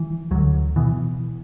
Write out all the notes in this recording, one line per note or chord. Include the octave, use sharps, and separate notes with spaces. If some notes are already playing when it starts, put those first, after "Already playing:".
Already playing: E3
D2 D3 F#3
B2 E3